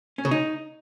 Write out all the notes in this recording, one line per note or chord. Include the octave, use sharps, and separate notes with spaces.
C#4
C#3
D#4